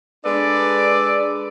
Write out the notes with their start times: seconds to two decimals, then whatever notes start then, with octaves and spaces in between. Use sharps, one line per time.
0.24 G#3 D4 A4 B4 D5